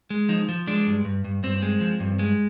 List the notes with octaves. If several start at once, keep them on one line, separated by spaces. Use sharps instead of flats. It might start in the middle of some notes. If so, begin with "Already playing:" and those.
G#3
F3 D#4
F3
G#3 D4
G2
G2
G2
G2 C4
G#3
F3
G2
G#3